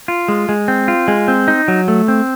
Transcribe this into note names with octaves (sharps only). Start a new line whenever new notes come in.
F4
G#3
G#3
C4
F4
G#3
C4
D#4
F#3
A3
C4